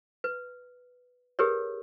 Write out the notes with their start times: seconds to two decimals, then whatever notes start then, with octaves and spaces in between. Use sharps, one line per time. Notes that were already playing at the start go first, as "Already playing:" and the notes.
0.24 B4
1.39 G4 G#4 A#4 B4 C#5